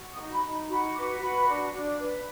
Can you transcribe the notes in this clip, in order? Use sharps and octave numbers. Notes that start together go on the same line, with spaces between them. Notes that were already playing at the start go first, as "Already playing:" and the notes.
Already playing: F#4
D#6
D#4
B5
D#4
B5
F#4 B5
B4 D6
F#4 B5
D4
D4
B4